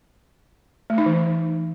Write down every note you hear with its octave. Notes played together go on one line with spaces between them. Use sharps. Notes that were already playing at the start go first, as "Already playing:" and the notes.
A3
D#4
E3